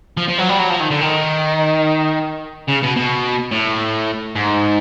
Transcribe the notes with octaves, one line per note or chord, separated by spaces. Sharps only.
F3
F3
F#3
G3
F#3
F3
D#3
D3
D#3
C#3
B2
B2
A2
G#2